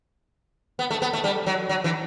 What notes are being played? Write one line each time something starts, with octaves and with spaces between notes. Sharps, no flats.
B3
A3
B3
A3
G3
F#3
F#3
E3